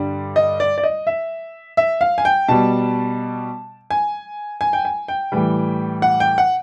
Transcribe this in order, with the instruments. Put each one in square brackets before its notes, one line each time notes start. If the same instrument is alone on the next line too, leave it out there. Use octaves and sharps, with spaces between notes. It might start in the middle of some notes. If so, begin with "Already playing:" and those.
Already playing: [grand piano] G2 D3 G3
D#5
D5
D5
D#5
E5
E5
F5
G#5
G5
B2 G3 A5
G#5
G#5
G5
G#5
G5
A2 E3 G3
F#5
G5
F#5